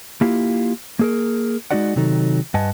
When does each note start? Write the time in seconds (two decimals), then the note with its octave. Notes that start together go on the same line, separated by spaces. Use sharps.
0.21 A#3 E4 F4 G4
0.99 A#3 G#4 A#4
1.71 G#3 B3 D#4 F#4 D5 F#5
1.96 C3 D#3 F#3 D#4 A4
2.54 G2 B4 D#5 F#5 G#5 A5